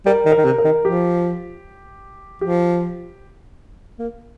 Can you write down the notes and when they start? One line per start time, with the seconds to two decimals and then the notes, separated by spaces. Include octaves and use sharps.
0.06 G3 A#4
0.26 D#3
0.32 A#4
0.38 D#3
0.45 C3
0.58 A#4
0.64 D#3
0.85 F3 G4
2.41 F3 G4
3.99 A#3